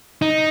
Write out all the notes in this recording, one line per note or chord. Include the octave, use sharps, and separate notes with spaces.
D#4